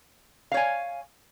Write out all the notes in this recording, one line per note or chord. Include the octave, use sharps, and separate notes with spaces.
C#5 F5 G#5